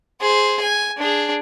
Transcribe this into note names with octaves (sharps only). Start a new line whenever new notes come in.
G#4 C5
G#5
D4 G#4